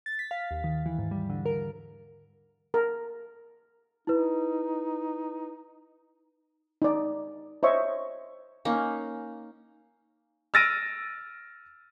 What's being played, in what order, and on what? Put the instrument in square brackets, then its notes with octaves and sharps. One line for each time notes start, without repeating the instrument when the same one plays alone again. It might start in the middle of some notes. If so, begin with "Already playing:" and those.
[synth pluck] A6
B6
F5
D#2
D#3
E3
G#2
G3
D3
A#4
[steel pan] A#4
[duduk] D#4 [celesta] E4 B4
[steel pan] D#4 D5
C5 C#5 D#5 E5 C#6
[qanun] A#3 C#4 D#4
[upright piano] E6 F6 A6 A#6 D7 D#7